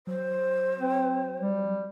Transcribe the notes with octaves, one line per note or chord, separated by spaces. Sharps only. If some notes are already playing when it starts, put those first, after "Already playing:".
F#3 C5
C4
G3